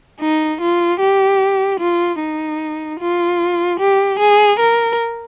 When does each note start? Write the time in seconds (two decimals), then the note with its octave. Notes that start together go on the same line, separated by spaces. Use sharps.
0.20 D#4
0.61 F4
1.00 G4
1.80 F4
2.20 D#4
3.00 F4
3.80 G4
4.19 G#4
4.60 A#4